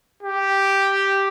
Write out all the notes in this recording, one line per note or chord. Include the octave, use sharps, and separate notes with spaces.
G4